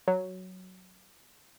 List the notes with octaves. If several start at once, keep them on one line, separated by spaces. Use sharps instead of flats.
F#3